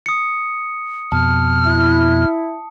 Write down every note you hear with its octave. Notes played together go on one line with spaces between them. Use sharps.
D#6 C#7
F2 B2 A5 F6
E4